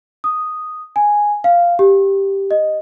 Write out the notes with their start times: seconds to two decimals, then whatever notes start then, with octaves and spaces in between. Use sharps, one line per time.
0.24 D#6
0.96 G#5
1.44 F5
1.79 G4
2.51 D#5